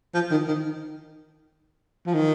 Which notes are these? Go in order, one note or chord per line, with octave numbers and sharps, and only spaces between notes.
F3
D#3
D#3
F3
D#3